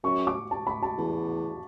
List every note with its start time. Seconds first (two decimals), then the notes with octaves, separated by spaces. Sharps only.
0.03 F#2 C#6
0.27 D6
0.51 A5
0.67 B5
0.83 A5
0.98 E2